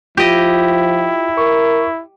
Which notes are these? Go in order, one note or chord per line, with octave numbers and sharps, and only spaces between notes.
F3 E4 F4 G4 D#5
A#4 C#6